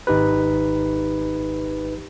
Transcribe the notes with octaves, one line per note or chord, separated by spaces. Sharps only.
G#1 D#4 G4 B4